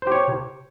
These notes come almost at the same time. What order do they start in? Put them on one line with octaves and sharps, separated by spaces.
C5 G4 C#5